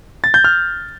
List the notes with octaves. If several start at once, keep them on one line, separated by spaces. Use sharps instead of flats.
A6
G6
F6